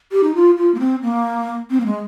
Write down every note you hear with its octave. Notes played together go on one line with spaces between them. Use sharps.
G4
D#4
F4
F4
A#3
C4
A#3
C4
A#3
G#3